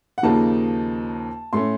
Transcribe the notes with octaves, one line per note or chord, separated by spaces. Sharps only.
F#5
D#2 C#3 F3 A#3 D#4 A5
A2 A3 C#4 C6